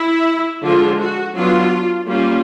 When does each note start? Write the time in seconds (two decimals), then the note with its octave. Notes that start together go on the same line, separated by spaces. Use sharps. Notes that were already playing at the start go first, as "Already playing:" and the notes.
Already playing: E4
0.64 D3 F3 G#3 F4
1.00 F#4
1.36 F#3 B3 D4 F4
2.08 G3 A#3 C#4 F4